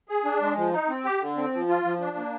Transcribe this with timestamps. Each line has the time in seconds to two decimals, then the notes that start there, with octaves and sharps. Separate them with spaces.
0.09 G#4
0.25 D4
0.41 G#3
0.57 F3
0.73 D#4
0.89 C4
1.05 G4
1.21 D3
1.37 C4
1.54 F3
1.69 F4
1.85 F3
2.01 D4
2.17 A#3